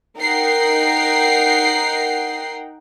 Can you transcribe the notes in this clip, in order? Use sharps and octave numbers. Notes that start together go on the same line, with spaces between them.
D#4 A#4 F#5 G5 C7